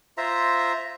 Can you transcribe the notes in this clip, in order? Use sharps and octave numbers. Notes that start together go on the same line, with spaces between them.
F4 C5 E5 A#5